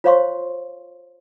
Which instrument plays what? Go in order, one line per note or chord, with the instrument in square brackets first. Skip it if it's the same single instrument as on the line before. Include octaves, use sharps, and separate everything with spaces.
[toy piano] F4 C5 C#5 F5 C6 C#6